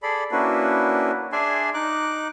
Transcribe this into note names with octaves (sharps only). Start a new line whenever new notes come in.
G#4 A4 D5 B5
A#3 C#4 D4 E4 F#4 B4
D4 G#4 D5 E5 G#5 C6
D#4 D6 F#6